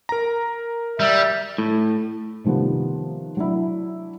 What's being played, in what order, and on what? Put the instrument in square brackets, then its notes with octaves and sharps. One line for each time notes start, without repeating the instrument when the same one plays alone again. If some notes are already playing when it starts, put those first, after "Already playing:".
[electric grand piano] A#4 A#5
[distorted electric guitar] G3 [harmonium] E5
[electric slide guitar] A2
[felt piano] C3 D#3 F3 G3 B3
F#3 D4 E4